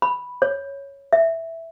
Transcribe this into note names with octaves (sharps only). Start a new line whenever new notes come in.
B5
C#5
E5